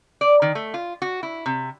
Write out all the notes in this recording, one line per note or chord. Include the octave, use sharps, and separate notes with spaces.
D5
D#3
A3
F4
F#4
E4
C3